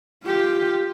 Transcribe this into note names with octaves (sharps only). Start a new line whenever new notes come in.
F4 G4